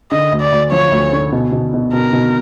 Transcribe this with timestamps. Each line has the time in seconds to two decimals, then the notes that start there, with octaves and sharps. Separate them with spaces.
0.12 D3 D#5
0.32 D2
0.42 D5
0.52 D2
0.72 F3 C#5
0.92 D2
1.12 D3
1.32 B2
1.52 B2
1.74 B2
1.93 B2 A#4
2.13 B2